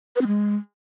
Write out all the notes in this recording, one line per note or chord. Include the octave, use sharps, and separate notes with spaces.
B4
C4
G#3